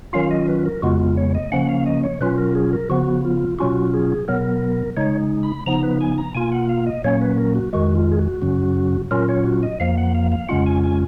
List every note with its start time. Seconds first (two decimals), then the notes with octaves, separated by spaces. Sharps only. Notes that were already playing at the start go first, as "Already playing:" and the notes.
0.13 D#3 F#3 C#4 F4 F5
0.31 D#5
0.48 B4
0.66 A#4
0.82 F2 C#3 G#3 B3 F4 F#4
1.00 F4
1.17 C#5
1.35 D#5
1.52 C#3 F3 A#3 C#4 F#5
1.69 F5
1.86 D#5
2.04 C#5
2.20 B2 F#3 C#4 F4 B4
2.38 A#4
2.55 G#4
2.73 A#4
2.89 C#3 F3 B3 F#4
3.25 F4
3.59 B2 F#3 C#4 F4 F#4
3.94 G#4
4.28 B2 F#3 B3 A#4
4.97 C#3 G#3 D#4 C#5
5.43 B5
5.66 C#3 F3 B3 D#4 A#5
5.83 B4
6.01 G#5
6.18 A#5
6.35 B2 A#3 F4 G#5
6.52 F#5
6.69 F5
6.86 D#5
7.04 A#2 F#3 A#3 C#4 C#5
7.22 B4
7.38 A#4
7.55 F#4
7.73 F2 D#3 G#3 F#4
7.95 F4
8.12 G#4
8.19 F#4
8.42 F#2 C#3 F#3 C#4
9.11 A#2 F#3 C#4 F4 A#4
9.29 C#5
9.45 F#4
9.63 D#5
9.80 F2 F3 A#3 F5
9.97 F#5
10.15 F5
10.32 F5
10.49 F2 C#3 G#3 C#4 F4 F#5
10.66 G#5
10.84 G#5